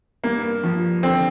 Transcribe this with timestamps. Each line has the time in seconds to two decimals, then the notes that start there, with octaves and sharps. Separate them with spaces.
0.24 G2 A#3
0.63 F3
1.03 D3 C4